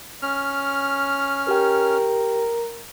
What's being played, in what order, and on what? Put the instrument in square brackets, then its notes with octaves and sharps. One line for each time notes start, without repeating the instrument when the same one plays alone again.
[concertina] C#4 F6
[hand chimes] G4 G5 [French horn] A#4